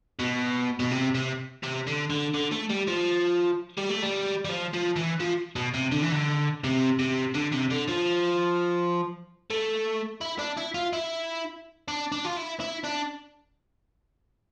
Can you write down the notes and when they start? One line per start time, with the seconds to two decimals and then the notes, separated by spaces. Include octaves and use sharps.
0.19 B2
0.80 B2
0.91 C3
1.15 C3
1.63 C3
1.87 D3
2.10 D3
2.34 D3
2.52 A3
2.70 G3
2.88 F3
3.78 G3
3.90 A3
4.03 G3
4.45 G3
4.49 F3
4.73 F3
4.96 E3
5.20 F3
5.56 B2
5.74 C3
5.92 D3
6.02 E3
6.12 D3
6.64 C3
6.99 C3
7.35 D3
7.53 C3
7.72 D3
7.89 F3
9.50 A3
10.21 E4
10.39 D4
10.57 E4
10.74 F4
10.93 E4
11.88 D4
12.12 D4
12.25 F4
12.36 E4
12.60 E4
12.84 D4